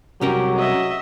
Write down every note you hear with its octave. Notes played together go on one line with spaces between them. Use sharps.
C2 F#3 C#4 G4 A#4
D#5 E5